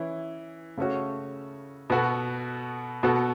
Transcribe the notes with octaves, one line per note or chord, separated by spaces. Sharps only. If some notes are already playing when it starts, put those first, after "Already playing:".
Already playing: E3 C#4 E4
C#3 A3 C#4 F#4 A4
B2 B3 F#4 A4
B2 B3 F#4 A4